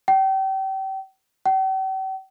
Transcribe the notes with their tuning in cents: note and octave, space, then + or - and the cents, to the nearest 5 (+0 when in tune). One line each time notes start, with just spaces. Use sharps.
G5 -30
G5 -45